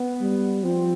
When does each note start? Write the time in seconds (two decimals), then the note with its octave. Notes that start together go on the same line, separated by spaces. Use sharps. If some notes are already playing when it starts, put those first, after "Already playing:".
Already playing: B3
0.21 G3
0.64 F3 C4